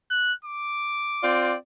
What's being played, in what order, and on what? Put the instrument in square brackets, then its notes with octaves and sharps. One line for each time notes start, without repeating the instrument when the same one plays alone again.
[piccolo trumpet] F#6
D6
[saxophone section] C4 F4 D5